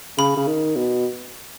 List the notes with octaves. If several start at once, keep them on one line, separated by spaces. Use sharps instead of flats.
C#3 B5
C#3
D#3
B2